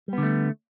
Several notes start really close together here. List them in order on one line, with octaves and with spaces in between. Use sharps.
G3 B3 D3 A3